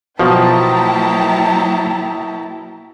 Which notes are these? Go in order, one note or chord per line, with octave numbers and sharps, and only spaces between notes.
B2 F3 F#3 A#3 E4 G5 A5 A#5